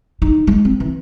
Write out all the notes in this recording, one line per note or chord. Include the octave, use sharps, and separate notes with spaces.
D#4
G#3
C4
E3